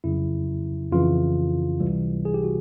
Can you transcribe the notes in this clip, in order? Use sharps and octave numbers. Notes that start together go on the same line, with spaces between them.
F2 C#3 F#3 E4
F2 C#3 E3 F4
C#2 C3 E3 G3
G#4
G4
F#4